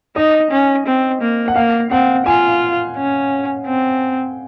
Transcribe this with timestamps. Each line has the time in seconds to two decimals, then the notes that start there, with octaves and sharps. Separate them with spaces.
0.16 D#4 D#5
0.51 C#4
0.86 C4
1.21 A#3
1.48 F#5
1.55 A#3 F5
1.91 C4 F#5
2.26 F4 G#5
2.97 C#4
3.66 C4